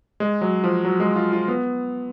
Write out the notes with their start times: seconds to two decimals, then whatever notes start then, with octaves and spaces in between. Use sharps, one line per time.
0.20 G#3
0.41 F#3
0.64 F3
0.85 F#3
1.00 G#3
1.16 F4
1.33 F4
1.48 B3